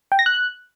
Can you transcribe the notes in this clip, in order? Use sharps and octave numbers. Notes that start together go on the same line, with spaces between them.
G5
A#6
F#6